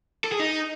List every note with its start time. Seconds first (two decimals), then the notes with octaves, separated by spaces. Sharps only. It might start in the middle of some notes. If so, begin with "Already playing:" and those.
0.24 A4
0.32 G#4
0.40 D#4